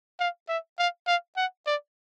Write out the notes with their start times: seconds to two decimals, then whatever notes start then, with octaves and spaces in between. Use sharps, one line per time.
0.20 F5
0.49 E5
0.79 F5
1.07 F5
1.37 F#5
1.67 D5